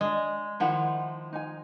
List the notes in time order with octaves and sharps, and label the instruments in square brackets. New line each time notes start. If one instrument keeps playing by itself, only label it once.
[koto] G#3 [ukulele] D4 D#5
[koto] D#3 F3 [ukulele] E4 F#5
[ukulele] D#4 G#5